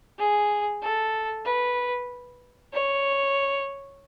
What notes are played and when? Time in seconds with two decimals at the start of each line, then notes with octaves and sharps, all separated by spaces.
0.19 G#4
0.82 A4
1.45 B4
2.73 C#5